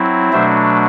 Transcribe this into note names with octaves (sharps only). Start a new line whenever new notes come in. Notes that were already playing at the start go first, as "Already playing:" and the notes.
Already playing: F#3 C4 E4
B2 F#3 A3 D4 C5 E5